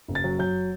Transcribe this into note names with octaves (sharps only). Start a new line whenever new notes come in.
F#1
A6
F#3
F#3 G6